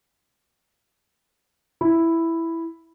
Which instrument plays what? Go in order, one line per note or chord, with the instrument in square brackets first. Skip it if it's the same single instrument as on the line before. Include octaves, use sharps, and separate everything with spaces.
[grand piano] E4